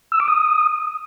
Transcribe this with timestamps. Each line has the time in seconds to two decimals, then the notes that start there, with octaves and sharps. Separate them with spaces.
0.12 E6
0.20 D6
0.28 D#6